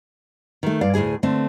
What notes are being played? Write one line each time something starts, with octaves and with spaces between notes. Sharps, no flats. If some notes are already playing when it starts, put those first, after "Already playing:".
D#3 A3
G2 D5 F5
D2 A2 C#3 G#4 G#5
D3 A3 C4